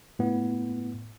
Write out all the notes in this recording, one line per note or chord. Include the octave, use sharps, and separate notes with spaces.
A2 B3